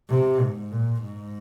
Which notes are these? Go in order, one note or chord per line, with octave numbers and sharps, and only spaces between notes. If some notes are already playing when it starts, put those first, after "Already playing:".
C3
G#2
A#2
G#2